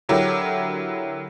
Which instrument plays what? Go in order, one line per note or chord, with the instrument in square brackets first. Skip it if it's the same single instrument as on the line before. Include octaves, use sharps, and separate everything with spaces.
[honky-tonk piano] D3 F#3 E4 G4 A#4